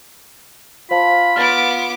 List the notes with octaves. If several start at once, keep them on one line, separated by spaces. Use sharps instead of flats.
F4 C5 F5 A5 B5
B3 D6 F6 A6